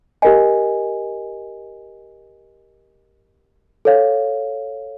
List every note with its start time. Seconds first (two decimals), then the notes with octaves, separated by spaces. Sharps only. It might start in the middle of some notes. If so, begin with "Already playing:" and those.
0.22 G4 A#4 D#5 G#5
3.85 A4 C#5 F5